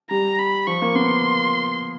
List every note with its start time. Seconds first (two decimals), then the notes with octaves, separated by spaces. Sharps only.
0.10 G3 A#5
0.39 B5
0.67 F3 C#6
0.82 A#3
0.95 B3 C6